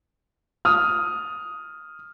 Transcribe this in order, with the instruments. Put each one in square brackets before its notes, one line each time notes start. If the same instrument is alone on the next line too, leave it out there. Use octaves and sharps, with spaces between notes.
[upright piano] D#6 F6